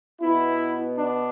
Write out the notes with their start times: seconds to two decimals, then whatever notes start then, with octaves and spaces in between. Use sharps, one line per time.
0.22 B2 B3 E4
0.98 D4